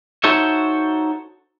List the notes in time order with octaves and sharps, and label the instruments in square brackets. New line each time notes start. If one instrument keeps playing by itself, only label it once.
[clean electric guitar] D#4 F#4 A4 C5 C#5 E5